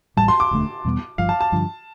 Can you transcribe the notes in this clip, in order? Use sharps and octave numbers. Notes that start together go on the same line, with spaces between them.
A1 A2 G3 A5
C6
D6
E1 D2 D3 A3
E2 B2 G3 B3
G1 G2 F3 F5
A5
A5
G2 D3 F3